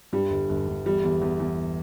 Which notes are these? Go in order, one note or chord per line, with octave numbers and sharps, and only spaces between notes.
G2 G3
G1
G1
G1
E2 G3
E2
E2
E2